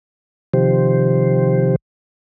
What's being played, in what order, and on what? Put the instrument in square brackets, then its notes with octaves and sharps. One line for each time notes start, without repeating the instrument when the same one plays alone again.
[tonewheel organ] C3 D#3 F3 G4 C5